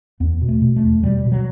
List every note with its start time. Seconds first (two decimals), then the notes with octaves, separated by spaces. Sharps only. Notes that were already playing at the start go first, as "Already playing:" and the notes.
0.20 E2 B3
0.42 B2
0.49 A3
0.62 B2
0.76 A3
0.83 E2
1.03 B2 G3
1.25 B2
1.32 F#3